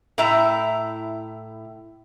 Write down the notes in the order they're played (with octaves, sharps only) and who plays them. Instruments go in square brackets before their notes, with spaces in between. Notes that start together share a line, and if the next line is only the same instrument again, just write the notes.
[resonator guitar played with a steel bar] A2 E4 E5 A#5